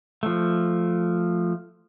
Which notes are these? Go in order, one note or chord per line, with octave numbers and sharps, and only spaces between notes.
F3 A3